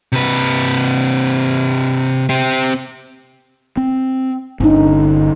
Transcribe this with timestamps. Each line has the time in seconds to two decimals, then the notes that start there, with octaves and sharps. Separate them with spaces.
0.12 C3 B4
2.29 C4 G4
3.77 C4
4.60 G1 D3 C#4 D#4